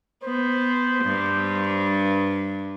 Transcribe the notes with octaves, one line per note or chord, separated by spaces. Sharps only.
B3 C5
G2